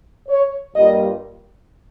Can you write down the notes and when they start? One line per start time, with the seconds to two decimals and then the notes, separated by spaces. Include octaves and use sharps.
0.28 C#5
0.75 G2 G3 A#3 F4 D#5